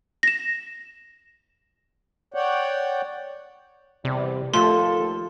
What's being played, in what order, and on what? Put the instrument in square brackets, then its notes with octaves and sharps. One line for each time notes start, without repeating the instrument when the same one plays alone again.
[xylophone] A#6 E7
[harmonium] C#5 D5 F#5 G5
[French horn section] E2 G3 D5 [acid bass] C3
[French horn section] D#2 A4 [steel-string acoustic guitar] F3 A5 [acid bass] A3 [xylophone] C6